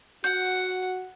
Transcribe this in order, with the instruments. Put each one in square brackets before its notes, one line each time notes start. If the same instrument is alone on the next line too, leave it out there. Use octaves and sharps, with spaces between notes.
[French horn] F#4 [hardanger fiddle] F#5 [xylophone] G6